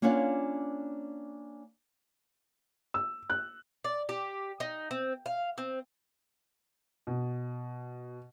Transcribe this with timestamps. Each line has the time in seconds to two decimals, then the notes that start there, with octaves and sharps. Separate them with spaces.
0.02 A#3 C#4 D4 F4 C#5 F#5
2.94 E6
3.30 F#6
3.84 D5
4.09 G4
4.60 D#4
4.91 C4
5.26 F5
5.58 C4
7.07 B2